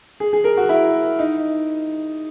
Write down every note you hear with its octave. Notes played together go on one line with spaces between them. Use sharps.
G#4
G#4
A#4
F#4
E4
D#4